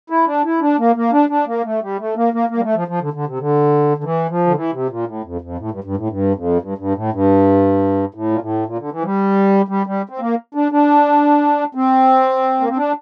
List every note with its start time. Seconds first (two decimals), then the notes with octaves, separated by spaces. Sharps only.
0.10 E4
0.27 D4
0.45 E4
0.61 D4
0.79 A#3
0.96 A#3
1.12 D4
1.29 D4
1.47 A#3
1.64 A3
1.82 G3
1.99 A3
2.16 A#3
2.33 A#3
2.49 A#3
2.58 G3
2.63 A3
2.75 F3
2.88 F3
3.01 D3
3.13 D3
3.27 C3
3.39 D3
3.97 D3
4.04 E3
4.29 F3
4.47 D3
4.55 E3
4.72 C3
4.89 A#2
5.07 A2
5.24 F2
5.41 F2
5.58 A2
5.71 G2
5.84 G2
5.97 A2
6.09 G2
6.35 F2
6.61 G2
6.78 G2
6.95 A2
7.13 G2
8.14 A2
8.31 A#2
8.41 A2
8.66 A#2
8.78 D3
8.92 E3
9.01 F3
9.04 G3
9.68 G3
9.86 G3
10.09 C4
10.20 A#3
10.55 D4
10.72 D4
11.75 C4
12.60 A#3
12.69 C4
12.77 D4